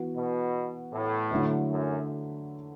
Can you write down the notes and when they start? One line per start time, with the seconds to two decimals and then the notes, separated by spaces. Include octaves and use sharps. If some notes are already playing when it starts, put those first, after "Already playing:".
Already playing: E3 B3 F#4
0.15 B2
0.93 A2
1.31 D3 F#3 A3 E4
1.70 F#2